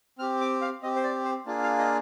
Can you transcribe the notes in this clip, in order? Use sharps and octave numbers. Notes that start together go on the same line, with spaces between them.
C4 G4 F6
D6
F5
C4 G4 D#5
C5
D5
C5
A#3 D4 F4 G#4
F5
D#5